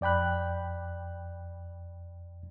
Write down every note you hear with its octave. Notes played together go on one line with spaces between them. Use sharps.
F2 D5 G5 B5 F#6